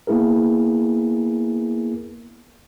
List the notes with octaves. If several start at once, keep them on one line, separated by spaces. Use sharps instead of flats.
A#3 B3 E4 G#4 A#4